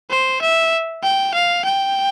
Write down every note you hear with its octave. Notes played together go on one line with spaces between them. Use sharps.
C5
E5
G5
F5
G5